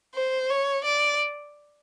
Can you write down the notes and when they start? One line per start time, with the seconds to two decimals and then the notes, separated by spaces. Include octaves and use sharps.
0.15 C5
0.50 C#5
0.85 D5